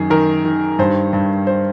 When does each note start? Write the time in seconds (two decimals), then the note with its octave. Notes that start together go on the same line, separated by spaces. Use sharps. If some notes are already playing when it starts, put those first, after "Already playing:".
Already playing: F#2 D#3 G#4
0.10 D#3 A#4
0.45 D#3
0.79 G2 C5
1.13 G2
1.47 C5